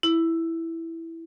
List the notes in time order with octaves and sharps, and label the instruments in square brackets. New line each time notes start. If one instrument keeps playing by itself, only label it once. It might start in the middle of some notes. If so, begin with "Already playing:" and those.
[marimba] E4